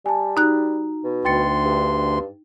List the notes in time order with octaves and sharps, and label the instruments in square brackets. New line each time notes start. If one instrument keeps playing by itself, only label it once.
[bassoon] G3 [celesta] G#5 A5
[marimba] D#4 F#6 [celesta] F#4 A#5
[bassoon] B2
[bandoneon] D2 C6 [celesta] G5 A6 C#7
[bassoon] G2